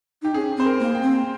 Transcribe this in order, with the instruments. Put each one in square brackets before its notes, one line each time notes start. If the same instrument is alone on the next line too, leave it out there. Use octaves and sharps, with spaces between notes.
[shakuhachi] D#4 [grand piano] G4
[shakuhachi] C#4 [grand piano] G#4
[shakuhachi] C4 [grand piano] C5
[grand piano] A#4
[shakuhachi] A#3
[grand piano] G5
[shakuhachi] C4